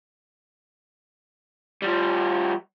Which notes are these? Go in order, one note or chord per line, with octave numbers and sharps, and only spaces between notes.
F3 G3